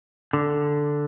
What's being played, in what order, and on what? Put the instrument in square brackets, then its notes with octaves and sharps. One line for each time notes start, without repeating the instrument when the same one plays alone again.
[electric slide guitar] D3